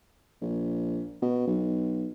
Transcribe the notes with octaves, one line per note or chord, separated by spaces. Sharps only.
A#1
B2
B1